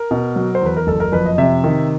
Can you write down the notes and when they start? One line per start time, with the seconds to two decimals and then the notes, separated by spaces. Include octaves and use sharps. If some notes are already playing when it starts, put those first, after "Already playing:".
Already playing: A#4
0.11 B2
0.36 F#3
0.55 C5
0.62 E2 B4
0.77 A#4
0.87 F#1 A4
1.00 A#4
1.12 F2 B4
1.26 D#5
1.38 C3 E5
1.64 D#3